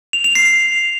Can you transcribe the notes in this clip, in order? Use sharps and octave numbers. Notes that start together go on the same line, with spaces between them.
F7
F7
C7